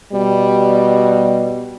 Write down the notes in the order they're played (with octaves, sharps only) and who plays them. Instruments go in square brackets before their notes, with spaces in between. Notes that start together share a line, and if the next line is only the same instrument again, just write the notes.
[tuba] B2 [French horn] G3